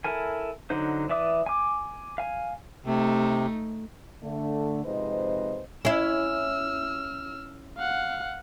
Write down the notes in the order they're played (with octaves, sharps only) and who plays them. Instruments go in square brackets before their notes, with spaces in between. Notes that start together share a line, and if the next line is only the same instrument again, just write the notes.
[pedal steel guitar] E4 A4 A#4 G#5
D3 F#3 D#4 C5
E3 D5 E5 D6 D#6
G#5 D6
F5 G#5
[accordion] C3 [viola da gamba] A3 D#4
[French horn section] D3 A3
F2 G#2 C3 B4 C5 D#5
[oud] C#4 E4 [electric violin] E6 F6
[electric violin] F5 F#5